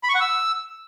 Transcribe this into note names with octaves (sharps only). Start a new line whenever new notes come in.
B5
C#6
F#5
E6